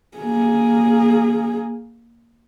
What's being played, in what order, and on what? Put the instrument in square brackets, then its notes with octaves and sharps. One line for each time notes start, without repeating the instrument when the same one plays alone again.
[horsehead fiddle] A#3 G#4